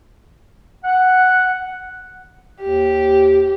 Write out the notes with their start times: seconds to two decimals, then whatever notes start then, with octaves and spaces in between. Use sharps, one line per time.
0.84 F#5
2.62 D#2 G4